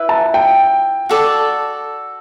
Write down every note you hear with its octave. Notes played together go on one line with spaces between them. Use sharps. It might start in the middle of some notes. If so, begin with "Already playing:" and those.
Already playing: E4 B4 E5
A5
G5
F#4 A4 D5 A5